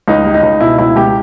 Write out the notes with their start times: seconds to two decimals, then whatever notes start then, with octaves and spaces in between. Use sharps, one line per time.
0.08 C#2 D#4
0.25 G3
0.34 D#4
0.43 C#2
0.60 B2 E4
0.78 C#2 E4
0.96 C#2 G4